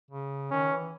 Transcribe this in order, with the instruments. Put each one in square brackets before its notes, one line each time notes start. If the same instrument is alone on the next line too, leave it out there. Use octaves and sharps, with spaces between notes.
[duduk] C#3
[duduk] D#3 [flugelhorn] C#4
[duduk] E3